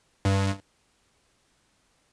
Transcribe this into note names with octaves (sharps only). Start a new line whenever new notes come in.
G2